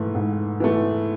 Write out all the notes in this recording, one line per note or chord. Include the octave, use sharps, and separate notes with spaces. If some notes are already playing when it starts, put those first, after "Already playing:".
Already playing: G#2 E3 A3
G#2
E3 A3